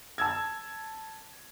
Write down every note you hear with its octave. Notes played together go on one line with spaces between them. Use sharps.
A5 E6 G#6